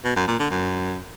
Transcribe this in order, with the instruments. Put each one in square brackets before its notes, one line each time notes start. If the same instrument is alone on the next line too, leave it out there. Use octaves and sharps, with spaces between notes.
[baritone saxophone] B2
F#2
A#2
D3
F#2